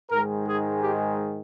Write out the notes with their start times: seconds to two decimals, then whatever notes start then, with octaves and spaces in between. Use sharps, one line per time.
0.11 G#2 D#3 G#3 A#4
0.47 G#4
0.81 G4